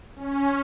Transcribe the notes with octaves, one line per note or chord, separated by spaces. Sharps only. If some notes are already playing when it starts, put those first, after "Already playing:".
C#4